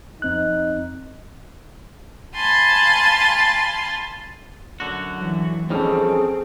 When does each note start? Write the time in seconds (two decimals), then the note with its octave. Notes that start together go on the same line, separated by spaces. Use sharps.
0.22 F2 C4 D#4 F#6
2.35 F5 G#5 A5 B5 C6
4.80 F#2 D3 F#4
5.17 E3 F#3
5.70 F2 D#3 G3 C4 C#4 G#4 A4